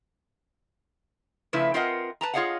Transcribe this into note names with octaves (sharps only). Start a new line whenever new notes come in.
C#3 F3 A3 E4 B4
C4 F4 A#4 B4 D#5 F#5
B4 A5 A#5
F4 G#4 C#5 D#5 F5 F#5